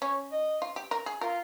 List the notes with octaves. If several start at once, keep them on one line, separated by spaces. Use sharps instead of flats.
C#4 C#5
D#5
F4
G4
A#4
G#4
F4 A#4